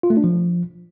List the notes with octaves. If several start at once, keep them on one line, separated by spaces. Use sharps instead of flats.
F4
A3
D4
F3